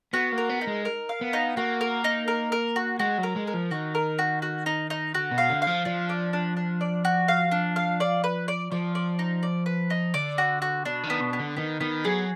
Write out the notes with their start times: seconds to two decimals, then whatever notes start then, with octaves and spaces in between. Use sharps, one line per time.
0.13 B3 F#4
0.32 A#3
0.38 A#4
0.49 B3
0.61 D#4
0.67 G#3
0.85 A#4
1.09 F5
1.21 B3
1.33 D#4
1.57 A#3 F#4
1.81 A#4
2.04 D#4
2.28 A#4
2.52 A#4
2.76 F#4
2.99 G#3 F#4
3.18 F#3
3.23 A#4
3.36 G#3
3.47 A#4
3.54 F3
3.71 D#3 F#4
3.95 A#4
4.19 F#4
4.42 F#4
4.66 D#4
4.90 D#4
5.14 D3 F#4
5.31 B2
5.38 F5
5.50 D3
5.62 F5
5.67 F3
5.85 F3 D4
6.09 D5
6.33 D4
6.57 D4
6.81 D5
7.05 F#4
7.28 F5
7.52 D4
7.76 F5
8.00 D5
8.24 B4
8.48 D5
8.72 F3 D5
8.95 D5
9.19 D#4
9.43 D5
9.66 B4
9.90 D#4
10.14 D3 D5
10.38 F#4
10.62 F#4
10.85 B2 D4
11.03 D#3
11.10 B3
11.21 B2
11.33 B3
11.39 D3
11.56 D#3 B3
11.81 D#3 B3
12.05 F#3 G#4